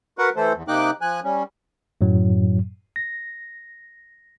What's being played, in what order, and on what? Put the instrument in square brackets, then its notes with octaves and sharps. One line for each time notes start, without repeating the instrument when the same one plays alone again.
[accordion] F#4 A#4 B4 F#5
E3 A3 A4 C5
E2
C3 A#3 D#4 G5 D6 F#6
F3 G#5 F#6
G3 C#4
[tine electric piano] F#2 A2 F#3
A#6